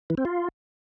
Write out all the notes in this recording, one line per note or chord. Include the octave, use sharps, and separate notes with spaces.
E3
C4
F4